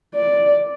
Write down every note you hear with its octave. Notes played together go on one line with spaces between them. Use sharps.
D5